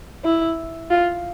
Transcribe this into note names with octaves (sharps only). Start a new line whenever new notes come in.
E4
F4